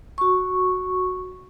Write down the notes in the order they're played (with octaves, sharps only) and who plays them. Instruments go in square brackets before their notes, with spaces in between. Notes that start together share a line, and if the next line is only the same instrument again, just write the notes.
[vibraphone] F#4 C#6